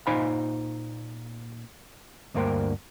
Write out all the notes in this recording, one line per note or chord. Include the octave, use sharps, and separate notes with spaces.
A#2 D#4 C5 F5 G#5 B5
D2 G2 A#3 A#4 C5 G5